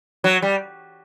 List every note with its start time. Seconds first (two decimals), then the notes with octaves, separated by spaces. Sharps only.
0.24 F#3
0.42 G3